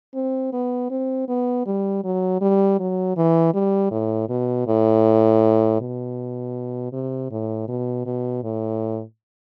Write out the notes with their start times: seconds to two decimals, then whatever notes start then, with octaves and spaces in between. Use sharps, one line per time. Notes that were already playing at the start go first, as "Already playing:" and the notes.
0.15 C4
0.53 B3
0.90 C4
1.28 B3
1.66 G3
2.04 F#3
2.41 G3
2.79 F#3
3.16 E3
3.54 G3
3.91 A2
4.29 B2
4.67 A2
5.80 B2
6.92 C3
7.31 A2
7.68 B2
8.05 B2
8.43 A2